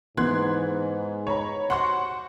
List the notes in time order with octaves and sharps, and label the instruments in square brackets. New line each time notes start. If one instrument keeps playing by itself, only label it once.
[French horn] G#2 [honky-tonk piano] E3 F#6 G#6 [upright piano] B3 [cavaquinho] C6
[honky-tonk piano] C#5 A#5 B5
[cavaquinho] F#4 C5 C6 [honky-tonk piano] F#5 C#6